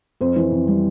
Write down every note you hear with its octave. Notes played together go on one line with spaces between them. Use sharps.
F2 C5
E3
F2
G3